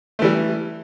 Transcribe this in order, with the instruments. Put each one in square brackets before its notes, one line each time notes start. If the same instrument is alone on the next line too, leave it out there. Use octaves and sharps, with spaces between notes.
[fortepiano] A3
E3
G3